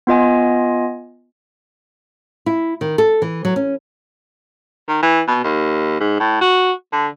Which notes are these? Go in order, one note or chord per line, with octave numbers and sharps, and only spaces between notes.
B3 F4 D#5 G#5
E4
D#3
A4
E3
F#3
C#4
D#3
E3
B2
D#2
G#2
A2
F#4
D3